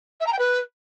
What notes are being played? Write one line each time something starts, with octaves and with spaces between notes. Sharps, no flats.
E5
A#5
G5
B4